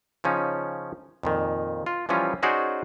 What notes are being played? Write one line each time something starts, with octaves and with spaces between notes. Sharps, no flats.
C#3 F3 C#4 D#4
F2 A#2 D#3
F4
E3 F3 G3 C#4 F4
C#4 D#4 F#4 G#4 C5 D5